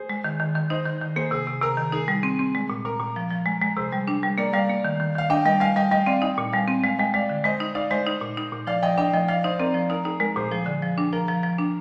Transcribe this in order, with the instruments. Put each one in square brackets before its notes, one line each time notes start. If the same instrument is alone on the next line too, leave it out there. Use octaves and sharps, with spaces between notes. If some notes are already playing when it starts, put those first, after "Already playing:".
Already playing: [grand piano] G#4 C5
[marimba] G#3
D#3
D#3
D#3
[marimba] D#4 [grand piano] C5 D#5
[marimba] D#3
D#3
[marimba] A#3 [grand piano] G#4 C5
[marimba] C3 [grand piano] G#4
[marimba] C3
[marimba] C3 [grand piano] A#4
[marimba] D#3
[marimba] D#4 [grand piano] G#4
[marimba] G3
C4
C4
G#3
A#2
[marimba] A#2 [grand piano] A#4
[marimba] A#2
F3
F3
G#3
G#3
[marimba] C3 [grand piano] G#4 C5
[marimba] G3
D4
G3
[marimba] A#3 [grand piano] A#4 D5
[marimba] G3 [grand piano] D5 F5
[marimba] A#3
D#3
D#3
[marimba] D#3 [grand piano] F5
[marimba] D4 [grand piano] D#5 G5
[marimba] G3 [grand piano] D#5 G5
[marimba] G3 [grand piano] F5 G#5
[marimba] G3 [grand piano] D#5 G5
[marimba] G3 [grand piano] D#5 G5
[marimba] C4 [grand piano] D5 F5
[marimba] D#4 [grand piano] D#5 G5
[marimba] A#2
[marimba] G3 [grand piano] F5 G#5
[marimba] C4
[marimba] G#3 [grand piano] F5 G#5
[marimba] G#3 [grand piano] D#5 G5
[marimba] G#3 [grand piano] D5 F5
[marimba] D3
[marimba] G#3 [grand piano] C5 D#5
[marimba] D#4
[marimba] D#4 [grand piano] D5 F5
[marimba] G#3 [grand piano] C5 D#5
[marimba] D#4
A#2
D#4
A#2
[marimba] F3 [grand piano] D5 F5
[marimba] F3 [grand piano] D#5 G5
[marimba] D4 [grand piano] D#5 G5
[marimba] F3 [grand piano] D#5 G5
[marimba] F3 [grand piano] D5 F5
[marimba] D#4 [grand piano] C5 D#5
[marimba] C4 [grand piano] A#4 D5
[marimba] F3
[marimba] D#4 [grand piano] A#4
[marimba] D#4 [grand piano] G#4
[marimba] G#3 [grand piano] A#4
[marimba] A#2 [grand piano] G#4 C5
[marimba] F3 [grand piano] G#4
[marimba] D3
F3
D4
[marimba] F3 [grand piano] A#4
[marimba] F3
F3
D4